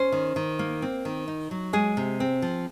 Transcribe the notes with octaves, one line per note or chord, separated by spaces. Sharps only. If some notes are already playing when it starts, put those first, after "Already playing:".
Already playing: C#4 C5
D#3
D#3
A#3
C4
D#3
D#4
F#3
G#3 G#4
C3
C4
F3